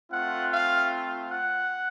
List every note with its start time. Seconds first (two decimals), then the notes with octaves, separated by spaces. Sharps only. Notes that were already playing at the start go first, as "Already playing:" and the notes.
0.11 A3 C4 F4 F#5
0.51 F5
1.31 F#5